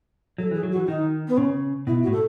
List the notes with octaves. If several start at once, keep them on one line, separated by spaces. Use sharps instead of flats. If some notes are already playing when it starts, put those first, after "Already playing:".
F#3 A4
E3 G#4
F#3
F#4
E3
D#3 D#4
B3
C#3 C#4
B2 E4
F#4
A2
A4